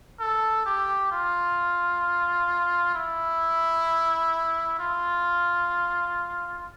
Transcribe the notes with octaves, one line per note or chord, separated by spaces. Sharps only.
A4
G4
F4
E4
F4